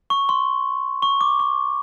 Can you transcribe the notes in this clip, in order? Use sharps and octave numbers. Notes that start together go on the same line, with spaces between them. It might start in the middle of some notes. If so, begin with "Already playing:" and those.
C#6
C6
C#6
D6
C#6